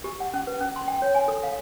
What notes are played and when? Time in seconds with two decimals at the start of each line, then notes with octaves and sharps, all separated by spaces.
0.04 G4
0.20 F#5
0.34 C#4
0.47 B4
0.61 C#4
0.76 C6
0.88 G5
1.02 C#5
1.15 G#5
1.28 A4
1.43 F5